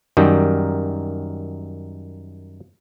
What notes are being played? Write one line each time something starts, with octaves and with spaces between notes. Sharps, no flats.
F#2 D#3 G3